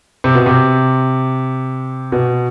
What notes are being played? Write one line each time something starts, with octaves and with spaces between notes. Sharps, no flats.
C3
B2
C3
B2